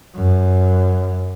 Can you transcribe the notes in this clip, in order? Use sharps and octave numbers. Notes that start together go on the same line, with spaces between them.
F#2